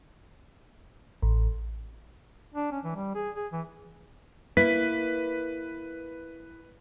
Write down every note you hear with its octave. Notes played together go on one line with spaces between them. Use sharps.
A1
D4
C#4
E3
G3
G#4
G#4
E3
A#3 E4 B4 B6